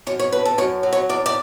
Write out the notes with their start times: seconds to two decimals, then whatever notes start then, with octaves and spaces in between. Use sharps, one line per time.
0.07 F#2 C#5
0.19 C#5
0.32 D3 B4
0.45 A4
0.58 F#2 C#5
0.83 F#3
0.93 C#5
1.09 E2 D5
1.26 D5